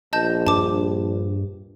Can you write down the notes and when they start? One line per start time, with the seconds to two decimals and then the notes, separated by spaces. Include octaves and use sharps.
0.13 A#1 D#5 A5 G6
0.47 G2 A5 D6